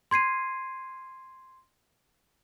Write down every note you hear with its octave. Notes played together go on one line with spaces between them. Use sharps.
C6 G#6 C7 D#7